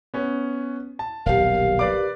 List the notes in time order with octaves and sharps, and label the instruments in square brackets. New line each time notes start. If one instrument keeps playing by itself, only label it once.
[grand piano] B3 C#4
A5
[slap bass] D#1 B1 [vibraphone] G4 A#4 [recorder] F5
[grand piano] B4 D5 D6